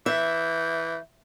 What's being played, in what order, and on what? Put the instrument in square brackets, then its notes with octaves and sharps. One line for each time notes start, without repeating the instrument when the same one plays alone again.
[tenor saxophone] E3 [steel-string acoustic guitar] E5 [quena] G6